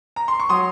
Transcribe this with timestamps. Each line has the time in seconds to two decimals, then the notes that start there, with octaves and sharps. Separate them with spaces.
0.16 A#5
0.28 C6
0.40 C#6
0.49 F#3 C6 D#6